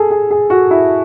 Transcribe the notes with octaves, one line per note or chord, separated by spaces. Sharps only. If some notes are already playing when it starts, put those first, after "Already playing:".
Already playing: G#4 A4
G#4
G#4
F#4
E4